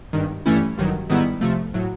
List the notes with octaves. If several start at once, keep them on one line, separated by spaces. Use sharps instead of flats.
G#1 G2 D#3
G2 E3 A3 C#4 E4
A1 G2 D#3 F#3
G#2 D#3 G3 B3 E4
C3 F3 A3
A2 F#3